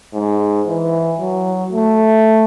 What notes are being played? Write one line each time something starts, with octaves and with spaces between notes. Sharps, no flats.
G#2
E3
F#3
A3